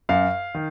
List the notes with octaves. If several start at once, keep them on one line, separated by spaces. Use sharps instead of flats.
F#2 F5
D#3